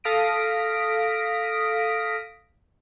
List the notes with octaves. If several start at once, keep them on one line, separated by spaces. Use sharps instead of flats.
A4 F5 D#6 A#6 B6 D7